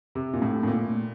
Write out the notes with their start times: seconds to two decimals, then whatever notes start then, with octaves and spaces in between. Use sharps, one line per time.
0.15 C3
0.34 A#2
0.42 A2
0.63 A2
0.67 A#2